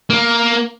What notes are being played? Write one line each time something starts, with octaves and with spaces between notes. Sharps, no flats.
A#3